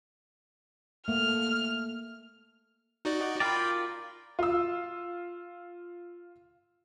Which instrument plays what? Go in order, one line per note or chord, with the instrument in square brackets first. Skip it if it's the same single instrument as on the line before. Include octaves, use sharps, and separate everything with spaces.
[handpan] A3 A#3 [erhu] F6
[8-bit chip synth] D#4 F#4 D5
[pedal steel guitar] F4 A#4 D5 [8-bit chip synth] G5 B5
[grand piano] F4 E6